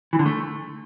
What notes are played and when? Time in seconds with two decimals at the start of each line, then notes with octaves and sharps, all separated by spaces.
0.13 E3
0.19 D3
0.26 A3